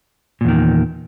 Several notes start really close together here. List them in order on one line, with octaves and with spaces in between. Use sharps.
A#2 E2 D#3